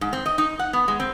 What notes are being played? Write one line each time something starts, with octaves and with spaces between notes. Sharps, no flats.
G#2
C4
D#5
D#4
F#5
B3
G#3
C4